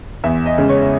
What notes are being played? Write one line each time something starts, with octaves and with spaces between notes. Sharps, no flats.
E2 E5
D#5
C#3 G#3
C#5